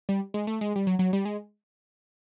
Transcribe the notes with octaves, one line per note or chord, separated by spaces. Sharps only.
G3
G#3
A3
G#3
G3
F#3
F#3
G3
G#3